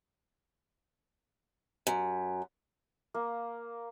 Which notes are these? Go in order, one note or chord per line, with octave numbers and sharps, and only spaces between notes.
F#2
A#3